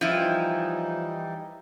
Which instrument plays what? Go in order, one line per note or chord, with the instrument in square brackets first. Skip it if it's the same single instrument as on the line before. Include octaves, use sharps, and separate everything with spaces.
[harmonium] E3 G3 D#4 [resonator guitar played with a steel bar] F3 E4